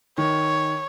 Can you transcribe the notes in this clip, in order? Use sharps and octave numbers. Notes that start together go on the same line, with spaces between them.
D#3 C#5